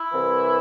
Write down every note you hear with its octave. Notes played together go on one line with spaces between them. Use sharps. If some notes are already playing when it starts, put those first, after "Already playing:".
Already playing: E4
C2 C3 E3